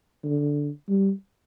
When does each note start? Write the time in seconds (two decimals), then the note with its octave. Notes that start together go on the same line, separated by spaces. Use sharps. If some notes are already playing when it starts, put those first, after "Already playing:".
0.24 D3
0.89 G3